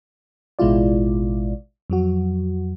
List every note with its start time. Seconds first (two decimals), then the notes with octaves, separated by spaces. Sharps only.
0.59 A1 B2 G#3 E4 F4 D5
1.90 F2 F#3 F#4